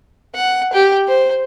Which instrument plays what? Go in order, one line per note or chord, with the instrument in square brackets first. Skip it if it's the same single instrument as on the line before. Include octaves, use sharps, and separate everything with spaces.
[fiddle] F#5
G4
C5